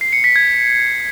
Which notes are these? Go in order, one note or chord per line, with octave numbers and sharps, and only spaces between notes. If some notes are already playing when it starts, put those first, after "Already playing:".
C7
C#7
B6
G#6